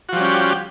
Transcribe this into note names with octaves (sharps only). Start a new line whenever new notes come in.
F3 G3 C#4 F#4 G4